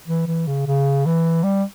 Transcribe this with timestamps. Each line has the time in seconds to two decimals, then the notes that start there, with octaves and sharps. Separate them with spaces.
0.08 E3
0.27 E3
0.47 C#3
0.67 C#3
1.06 E3
1.43 G3